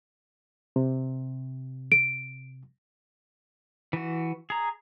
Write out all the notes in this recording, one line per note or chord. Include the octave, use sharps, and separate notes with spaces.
C3
D7
E3 F#4
G#4 A#5